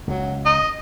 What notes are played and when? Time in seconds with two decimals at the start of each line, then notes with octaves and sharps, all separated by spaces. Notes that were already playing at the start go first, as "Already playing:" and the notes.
0.07 C#2 F#3
0.45 D#5